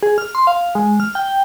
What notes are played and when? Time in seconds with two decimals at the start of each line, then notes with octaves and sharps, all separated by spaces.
0.03 G#4
0.18 F6
0.35 C6
0.47 F5
0.75 G#3
1.00 F6
1.15 G5